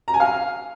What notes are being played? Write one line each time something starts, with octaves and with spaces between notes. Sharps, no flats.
A#5
G#5
F5